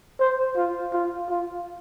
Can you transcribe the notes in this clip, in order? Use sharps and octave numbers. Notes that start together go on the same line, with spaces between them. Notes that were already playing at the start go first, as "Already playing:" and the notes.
C5
F4
F4
F4